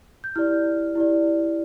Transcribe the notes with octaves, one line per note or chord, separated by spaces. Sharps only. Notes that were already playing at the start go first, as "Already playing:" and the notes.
G6
E4 G4 D5 F6
E4 G4 D5